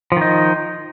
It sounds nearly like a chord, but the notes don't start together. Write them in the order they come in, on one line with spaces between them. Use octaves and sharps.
F3 D#3 D#4